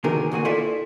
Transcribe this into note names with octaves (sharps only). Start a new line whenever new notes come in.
E2 B2 D3 D#3 G#4 A#4
D2 A#2 F#4 G#5
E4 F4 A4 D5 E5